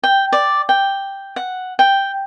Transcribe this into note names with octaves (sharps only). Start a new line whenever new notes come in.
G5
D5
G5
F#5
G5